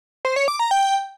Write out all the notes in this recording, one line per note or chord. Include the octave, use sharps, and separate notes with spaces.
C5
C#5
D6
A#5
G5